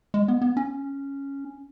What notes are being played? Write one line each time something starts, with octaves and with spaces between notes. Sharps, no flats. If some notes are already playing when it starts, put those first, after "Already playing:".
G#3
B3
B3
C#4